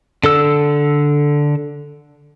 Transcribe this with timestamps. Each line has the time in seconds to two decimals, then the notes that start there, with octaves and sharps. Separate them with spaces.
0.24 D3 A4 E6